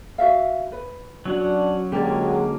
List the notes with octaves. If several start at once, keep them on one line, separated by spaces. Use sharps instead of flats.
F#4 E5 F5
B4
F#3 C#4 D4 F#4 F#5
D3 F#3 G#3 A#3 C#4 G4 D5